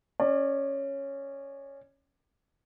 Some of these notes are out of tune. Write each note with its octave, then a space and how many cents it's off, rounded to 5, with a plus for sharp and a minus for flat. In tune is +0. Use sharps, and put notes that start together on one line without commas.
C#4 -5 D5 +25